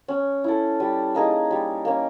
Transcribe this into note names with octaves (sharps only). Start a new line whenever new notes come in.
C#4
E4 A4
G3
A#3 D#4 G#4
G3
A#3 C#4